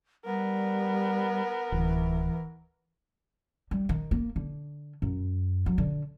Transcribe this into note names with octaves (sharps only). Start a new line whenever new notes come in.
G3 B3 A#4
D1 E3
G3
D#3
A#3
D3
F#2
F#3
D3